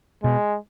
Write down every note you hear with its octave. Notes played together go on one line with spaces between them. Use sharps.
B2 G#3